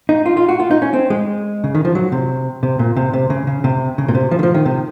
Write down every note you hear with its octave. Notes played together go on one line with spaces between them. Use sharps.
D#4
F4
F4
F#4
F4
D#4
C#4
C4
G#3
C#3
D#3
F3
F#3
C3
C3
A#2
C3
C3
C#3
C#3
C3
C#3
A#2
C3
F3
D#3
F3
D#3
C3